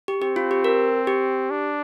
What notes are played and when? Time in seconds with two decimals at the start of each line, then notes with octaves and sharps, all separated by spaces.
0.08 G4
0.22 C4 G4
0.36 F4
0.51 G4
0.64 A#4
1.07 G4
1.50 D4